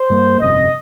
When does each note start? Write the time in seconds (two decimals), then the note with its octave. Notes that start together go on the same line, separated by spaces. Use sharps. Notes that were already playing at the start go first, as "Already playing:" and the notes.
Already playing: C5
0.10 G2 G3 A#3
0.40 G1 F2 C3 D#5